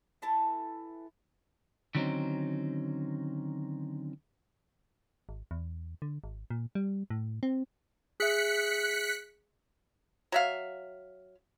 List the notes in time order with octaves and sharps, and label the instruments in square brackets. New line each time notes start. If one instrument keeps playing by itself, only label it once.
[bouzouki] E3 E4 A4 A5
[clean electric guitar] D3 D#3 F#3 C4 C#4 D#4
[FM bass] G#1
E2
D3
G#1
A#2
G3
A2
C4
[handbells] G#4 E5 [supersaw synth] F#6 B6 C#7
[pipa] F#3 E5 F5